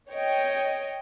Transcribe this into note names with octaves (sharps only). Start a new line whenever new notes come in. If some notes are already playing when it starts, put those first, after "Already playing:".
C#5 D#5 G5